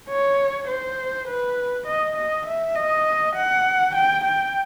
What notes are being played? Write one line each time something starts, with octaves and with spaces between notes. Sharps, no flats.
C#5
C5
B4
D#5
D#5
E5
D#5
F#5
G5
G5